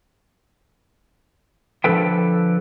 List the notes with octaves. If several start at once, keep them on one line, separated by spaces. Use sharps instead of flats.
D3 F3 A4 B4 G5